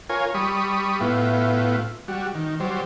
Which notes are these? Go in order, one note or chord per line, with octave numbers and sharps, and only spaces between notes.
F4 A#4 C#5 G#5
G3 B5 C#6 D#6
A2 B3 E4 F4
G3 F#4
D#3
F#3 G3 C5